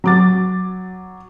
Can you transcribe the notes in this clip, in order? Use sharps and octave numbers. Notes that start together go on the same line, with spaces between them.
F#3 D6 A6